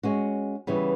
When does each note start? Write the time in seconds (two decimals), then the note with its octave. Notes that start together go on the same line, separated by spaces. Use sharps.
0.03 G#3 C#4 F#4
0.67 C#3 E3 G3 B3